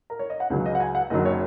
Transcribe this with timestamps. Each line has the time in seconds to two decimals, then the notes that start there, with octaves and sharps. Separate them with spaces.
0.10 A#4
0.19 C#5
0.30 D#5
0.40 F#5
0.50 C#2 C#3 F#3 G#5
0.66 D#5
0.75 F#5
0.80 G#5
0.95 F#5
1.10 F#1 F#2 D#3 F#3 D#5
1.25 C#5